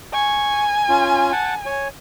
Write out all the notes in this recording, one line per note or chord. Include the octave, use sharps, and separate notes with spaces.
G#5 C#6
C#4 F4
F#5 A5
C#5 G#5